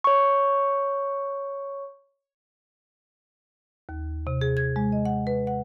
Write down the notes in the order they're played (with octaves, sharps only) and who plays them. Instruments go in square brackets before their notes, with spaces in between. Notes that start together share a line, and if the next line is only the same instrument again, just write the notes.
[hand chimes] C#5 C#6
[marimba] D#2
C3
G#4
G#6
G#3
D#5
F#5
B4
F#5